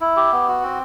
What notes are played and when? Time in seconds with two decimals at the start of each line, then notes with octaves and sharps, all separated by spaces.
0.01 E4
0.17 G4
0.32 B3
0.48 F#4
0.63 C4